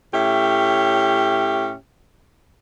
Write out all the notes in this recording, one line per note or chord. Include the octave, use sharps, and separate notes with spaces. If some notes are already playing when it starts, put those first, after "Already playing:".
A2 C#4 G4 E5